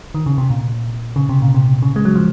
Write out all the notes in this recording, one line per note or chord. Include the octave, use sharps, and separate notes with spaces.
D#3
C#3
C3
A#2
C#3
C3
A#2
C3
C#3
G#3
F#3
F3